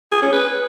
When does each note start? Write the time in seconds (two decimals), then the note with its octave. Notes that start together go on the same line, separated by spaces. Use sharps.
0.12 G#4
0.22 C#4
0.33 B4